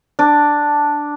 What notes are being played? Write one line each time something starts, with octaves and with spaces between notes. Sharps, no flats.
D4